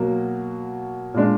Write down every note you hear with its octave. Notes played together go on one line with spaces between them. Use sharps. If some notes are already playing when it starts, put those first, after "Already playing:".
Already playing: B2 F#3 A#3
A#2 G#3 D4